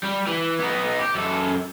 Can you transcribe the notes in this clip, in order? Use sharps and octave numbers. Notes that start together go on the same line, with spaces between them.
G3
E3
B3 D#4
G4
F#2 A4